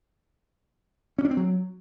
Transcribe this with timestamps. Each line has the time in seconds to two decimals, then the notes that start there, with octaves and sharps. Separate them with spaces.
1.18 C#4
1.25 D4
1.31 C4
1.37 F#3